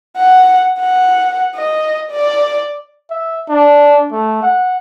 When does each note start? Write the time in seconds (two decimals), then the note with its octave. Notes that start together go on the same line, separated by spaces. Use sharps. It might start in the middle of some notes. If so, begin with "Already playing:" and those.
0.17 F#5
0.80 F#5
1.56 D#5
2.11 D5
3.10 E5
3.49 D4
4.12 A3
4.43 F#5